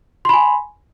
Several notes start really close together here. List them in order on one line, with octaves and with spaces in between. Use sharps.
C6 B5 G#5